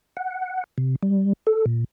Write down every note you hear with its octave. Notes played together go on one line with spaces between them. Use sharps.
F#5
C3
G3
A4
A#2